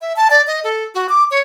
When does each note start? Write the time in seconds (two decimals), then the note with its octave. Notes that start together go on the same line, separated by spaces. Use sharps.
0.01 E5
0.16 A5
0.30 D5
0.47 D#5
0.64 A4
0.95 F#4
1.09 D6
1.31 C#5